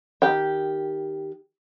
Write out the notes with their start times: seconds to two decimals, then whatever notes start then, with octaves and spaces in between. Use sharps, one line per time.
0.22 D#3 G4 G5